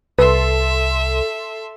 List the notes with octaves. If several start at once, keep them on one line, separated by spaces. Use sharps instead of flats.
C2 A4 B4 E5 C6